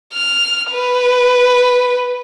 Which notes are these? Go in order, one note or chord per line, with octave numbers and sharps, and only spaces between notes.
F6
B4